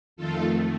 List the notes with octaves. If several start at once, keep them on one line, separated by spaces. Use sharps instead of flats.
F2 D#3 A3 F4 A4